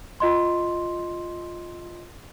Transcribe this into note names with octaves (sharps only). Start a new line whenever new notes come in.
F4 D#5 C6